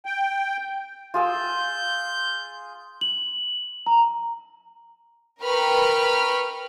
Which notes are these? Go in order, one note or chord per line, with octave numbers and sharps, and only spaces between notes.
G5
F4 G#4 E6 G6
F#7
A#5
A#4 B4 G5 B5 C#6 F6